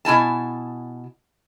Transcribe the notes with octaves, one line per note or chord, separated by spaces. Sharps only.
B2 E4 G#5 A5